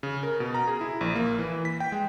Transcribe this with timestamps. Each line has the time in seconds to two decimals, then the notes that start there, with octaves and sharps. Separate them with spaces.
0.03 C#3
0.23 A#4
0.40 B2
0.54 A#5
0.68 G#4
0.81 E4
1.01 A#1
1.16 A#3
1.39 E3
1.65 B6
1.80 G5
1.92 G#3